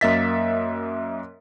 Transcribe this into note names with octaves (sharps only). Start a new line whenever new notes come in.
F#2 A#3 D#5 E5 A6 B6